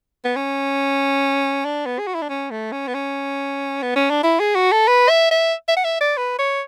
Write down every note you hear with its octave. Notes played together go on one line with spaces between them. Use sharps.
B3
C#4
D4
B3
G#4
F#4
E4
D4
C#4
A3
C#4
B3
C#4
B3
C#4
D4
E4
G#4
F#4
A4
B4
E5
E5
E5
F#5
E5
D5
B4
C#5